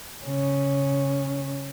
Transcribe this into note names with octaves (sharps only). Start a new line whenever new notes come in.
C#3 C#4